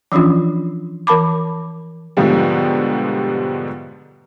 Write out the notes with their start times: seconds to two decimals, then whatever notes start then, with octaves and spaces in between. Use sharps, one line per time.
0.12 E3 F3 C#4 D4 F4
1.07 E3 A#4 A5 B5 D6
2.17 G#2 B2 D3 F3 G3